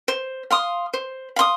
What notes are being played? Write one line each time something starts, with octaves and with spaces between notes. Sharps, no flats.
C5
F5 C6 D#6
C5
F5 C6 D#6